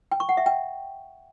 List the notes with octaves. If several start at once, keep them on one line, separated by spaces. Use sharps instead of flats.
G5
C#6
F#5
E5
G5